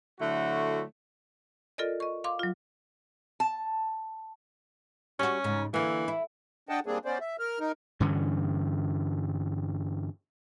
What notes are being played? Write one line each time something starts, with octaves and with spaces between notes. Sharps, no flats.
D3 F#3 A3 E4 F#4
F4 A4 A#4 D5 D#5
D#5 C#6
F5 C6 D6
F#3 F4
A5
G3 C#4 F#4
G#2 C#3
D3 E3 A#3
E4
D4 D#5 F#5 G5 A5
G3 A#3 C4 D4 G#4
B3 C#4 C5 D5
E5
A#4 F6
D#4 A#4
G2 D3 E3 C#4